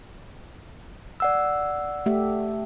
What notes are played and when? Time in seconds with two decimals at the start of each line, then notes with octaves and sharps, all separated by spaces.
1.20 D5 F#5 E6
2.06 A3 G4 E5